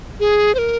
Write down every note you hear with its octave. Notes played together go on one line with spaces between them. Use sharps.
G#4
C5
A#4